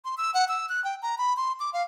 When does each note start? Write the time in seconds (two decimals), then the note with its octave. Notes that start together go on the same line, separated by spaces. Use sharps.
0.05 C6
0.18 E6
0.34 F#5
0.49 E6
0.69 F#6
0.84 G5
1.02 A#5
1.18 B5
1.37 C6
1.60 D6
1.73 F5